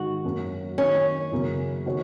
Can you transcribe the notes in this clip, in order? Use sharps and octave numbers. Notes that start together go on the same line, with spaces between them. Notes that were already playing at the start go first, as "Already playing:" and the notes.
Already playing: G#2 D#3 G#3 F#4
F#2 F#3 A#3 C#4
D#3 A#3 C#4 F#4 D#5
F#2 C#3 A#3
D#3 A#3 D#4 F#4 C#5